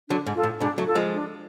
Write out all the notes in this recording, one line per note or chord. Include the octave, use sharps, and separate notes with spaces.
D3 F#3 D4
G#2
F4 A4
A2
G#2 B2 D4
F#3 A3
F4 A4
F3 G#3
D4